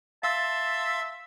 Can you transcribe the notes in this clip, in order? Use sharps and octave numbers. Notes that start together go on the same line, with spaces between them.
E5 F5 A5 C6 E6